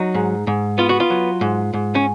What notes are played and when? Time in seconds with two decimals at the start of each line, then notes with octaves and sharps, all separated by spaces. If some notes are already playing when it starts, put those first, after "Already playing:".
Already playing: F#3 D#4
0.14 G#2
0.47 G#2
0.78 B3 F4
0.89 F#4
1.00 F4
1.10 F#3
1.41 G#2
1.73 G#2
1.95 C#4